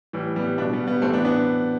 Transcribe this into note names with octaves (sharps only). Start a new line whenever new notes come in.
A2 E3 G3
G3 B3
B2 B3 D4
G3 B3
G3 B3
A2 E3 A3 C4
B3 D4
B3 D4